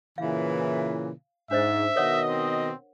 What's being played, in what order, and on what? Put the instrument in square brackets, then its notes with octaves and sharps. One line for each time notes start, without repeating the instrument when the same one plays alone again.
[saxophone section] A#2 C#3 E3 [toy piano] F5
[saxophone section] G#2 [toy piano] D4 C5 D#5 [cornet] E5
[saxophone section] B2 D#3 D#5 [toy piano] A#4 C#5 F#5
[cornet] C4